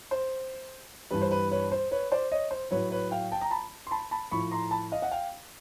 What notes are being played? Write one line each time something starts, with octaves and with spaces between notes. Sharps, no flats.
C5
G2 E3 G3 B4
C5
B4
B4 C#5
C5
B4 C#5
C5 D5
C#5 D#5
C5
A2 F#3 B4 C#5
B4 C#5
F5 G5
G5 A5
A#5
A5 B5
C6
A5 B5
A5 B5
A2 F3 B5 C#6
A#5 C6
A5 B5
D#5 F5
F#5
F5 G5